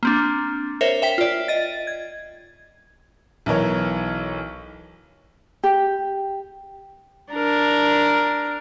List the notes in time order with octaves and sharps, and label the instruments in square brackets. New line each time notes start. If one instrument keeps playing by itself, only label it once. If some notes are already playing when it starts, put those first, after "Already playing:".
[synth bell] A#3 C4 D4
A#4 C5 C#5 E5
E5 G5 B6
F4 D5
D#5 A6
G#6
[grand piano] B1 E3 A#4 C#5
[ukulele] G4
[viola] D4 A#4